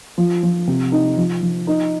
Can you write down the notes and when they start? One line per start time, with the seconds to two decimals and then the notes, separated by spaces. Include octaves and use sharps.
0.18 F3
0.43 F3
0.67 C3
0.92 D#4
1.17 F3
1.42 F3
1.67 D#4